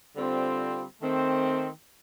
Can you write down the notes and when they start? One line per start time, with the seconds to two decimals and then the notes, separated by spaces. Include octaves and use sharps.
0.16 D3 G3 C4 F4
1.01 D#3 A3 C4